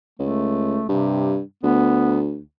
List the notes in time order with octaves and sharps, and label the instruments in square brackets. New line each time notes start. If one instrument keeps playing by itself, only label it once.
[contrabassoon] C#2 [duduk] A3
[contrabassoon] G2 [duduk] C3
[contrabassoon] D2 [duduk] B3